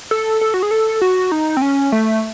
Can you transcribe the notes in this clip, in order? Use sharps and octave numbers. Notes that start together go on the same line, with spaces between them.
A4
A4
F#4
G#4
A4
F#4
D#4
C4
C#4
A3